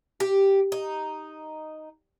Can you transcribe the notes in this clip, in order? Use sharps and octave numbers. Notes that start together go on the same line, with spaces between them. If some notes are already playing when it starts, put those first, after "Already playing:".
G4
D#4